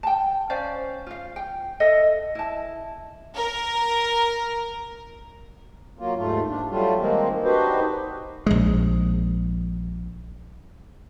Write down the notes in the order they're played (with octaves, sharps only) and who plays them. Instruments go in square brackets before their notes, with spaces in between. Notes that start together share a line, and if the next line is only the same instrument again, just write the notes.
[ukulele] G5 A5
C#4 C5 D5 F5
F4 F5
G5
A4 D#5 E5
E4 A5
[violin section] A#4
[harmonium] F#3 A#3 F4
D#2 G#2 A3 F4
D4
F#3 G3 A3 F4
D#3 G#3 A#3 C4
D4 D#4 F#4 G4 B4 C5
[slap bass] A#1 G#3